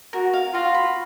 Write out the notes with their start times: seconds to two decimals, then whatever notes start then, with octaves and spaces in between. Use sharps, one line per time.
0.13 F#4 A#4
0.33 F5
0.53 F4 F#4
0.74 B5